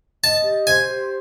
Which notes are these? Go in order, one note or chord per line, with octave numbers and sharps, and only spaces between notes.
D#5 A5
G4
C5 G#5
G4